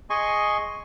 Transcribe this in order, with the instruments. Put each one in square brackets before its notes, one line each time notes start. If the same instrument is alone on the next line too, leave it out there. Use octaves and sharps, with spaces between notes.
[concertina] G#4 D#5 G#5 C6 C#6